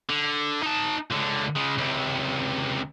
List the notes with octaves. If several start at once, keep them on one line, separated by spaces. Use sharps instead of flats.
D3
D#4 A5
C#2 D3
C#3 G#3
C#2 C3